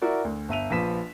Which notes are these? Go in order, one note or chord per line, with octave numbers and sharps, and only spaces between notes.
E4 F#4 A#4 D5
D2
G1 E5 D#7 F7
A#1 F3 B4 B6 E7